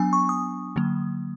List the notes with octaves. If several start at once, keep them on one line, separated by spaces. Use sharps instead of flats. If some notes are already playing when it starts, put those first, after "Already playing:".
Already playing: F#3 B3 D4 G#5
C#6
D#6
D3 F#3 A#3